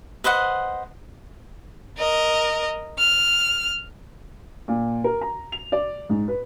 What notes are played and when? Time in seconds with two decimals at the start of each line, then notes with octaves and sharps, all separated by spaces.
0.24 B4 C5 D#5 F#5
1.98 A#4 D#5
2.98 F6
4.68 A#2
5.04 A#4
5.21 A#5
5.52 F7
5.72 D5
6.09 G#2
6.28 B4